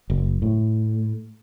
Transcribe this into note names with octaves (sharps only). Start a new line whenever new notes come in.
F#1
A2